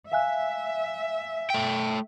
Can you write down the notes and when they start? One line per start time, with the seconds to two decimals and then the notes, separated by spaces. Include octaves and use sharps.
0.12 E5 F5 G#5 F#6
1.50 A3 G5